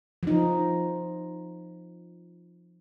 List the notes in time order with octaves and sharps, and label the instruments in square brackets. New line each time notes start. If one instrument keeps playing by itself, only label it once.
[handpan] F3 D#4